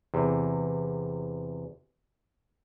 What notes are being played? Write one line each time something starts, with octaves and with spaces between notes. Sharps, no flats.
E2 C3